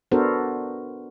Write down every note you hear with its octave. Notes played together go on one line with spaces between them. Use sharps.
B3 D4 F#4 A4 A#4 C5